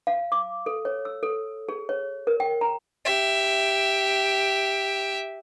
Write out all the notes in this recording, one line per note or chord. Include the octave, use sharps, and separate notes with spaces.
F5
D6
A4
C#5
E6
A4
G#4
C#5
A#4
G5
A#5
G4 E5